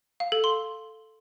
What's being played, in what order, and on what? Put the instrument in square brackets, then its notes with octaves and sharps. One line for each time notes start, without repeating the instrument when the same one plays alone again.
[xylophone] F5
A4
C6